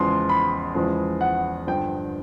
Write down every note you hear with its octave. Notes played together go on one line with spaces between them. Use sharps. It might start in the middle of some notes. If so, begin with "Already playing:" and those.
Already playing: E2 C#3 F3 G#3 C6
B5
E2 C#3 F3 G#3
F#5
G2 D3 F3 G5